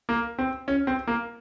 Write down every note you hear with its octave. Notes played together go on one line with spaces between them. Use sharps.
A#3
C4
C#4
C4
A#3